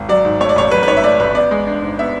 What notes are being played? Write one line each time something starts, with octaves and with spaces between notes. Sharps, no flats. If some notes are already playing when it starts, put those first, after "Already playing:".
Already playing: G#1
F#3 D5
G#2
A3 C#5
D5
A1 C#5
F#3 B4
B4
G#2 C#5
E5
A3 D5
A1 B4
B3 D5
G#3
D4
G#2
B3 E5